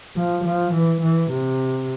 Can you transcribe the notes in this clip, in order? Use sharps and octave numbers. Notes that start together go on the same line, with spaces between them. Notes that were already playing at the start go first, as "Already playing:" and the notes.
F3
F3
E3
E3
C3